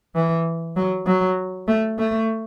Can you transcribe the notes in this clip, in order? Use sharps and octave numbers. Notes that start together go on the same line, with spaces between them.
E3
F#3
F#3
A3
A3